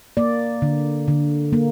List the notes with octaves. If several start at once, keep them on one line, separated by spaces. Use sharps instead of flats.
A#3 D5
D3
D3
A#3